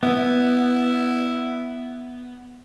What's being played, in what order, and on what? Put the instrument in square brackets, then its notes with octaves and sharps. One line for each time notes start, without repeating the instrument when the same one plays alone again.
[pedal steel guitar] B3 [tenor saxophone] E4